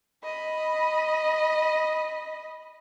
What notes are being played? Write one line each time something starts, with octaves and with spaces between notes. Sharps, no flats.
D#5 B5